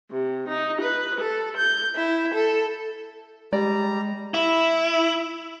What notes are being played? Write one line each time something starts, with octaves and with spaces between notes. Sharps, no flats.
C3
D#4
B4
A4
G6
E4
A4
G3 G#3 G4 D5 A#5
E4